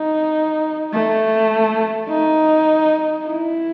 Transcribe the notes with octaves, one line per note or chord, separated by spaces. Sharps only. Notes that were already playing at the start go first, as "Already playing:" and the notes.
Already playing: D#4
A3
D#4
E4